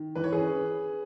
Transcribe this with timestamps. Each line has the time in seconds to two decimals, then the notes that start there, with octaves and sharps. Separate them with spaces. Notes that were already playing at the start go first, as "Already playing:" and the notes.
Already playing: D#3
0.16 E3 B4
0.24 C#5
0.32 G#4 B4
0.40 C#4